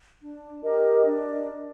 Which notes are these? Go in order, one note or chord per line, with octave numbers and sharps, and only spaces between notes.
D4
G4 A#4 D#5
D4